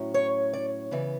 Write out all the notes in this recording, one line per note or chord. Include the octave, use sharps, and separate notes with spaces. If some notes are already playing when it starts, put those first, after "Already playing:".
Already playing: A2 F#3 C#4
C#5
D5
C#3 E3 B3 D5